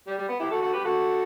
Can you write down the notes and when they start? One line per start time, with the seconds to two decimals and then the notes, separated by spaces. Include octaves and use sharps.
0.07 G3
0.18 G3
0.29 B3
0.40 E4 G4
0.51 F#4 A4
0.62 F#4 A4
0.73 G4 B4
0.84 F#4 A4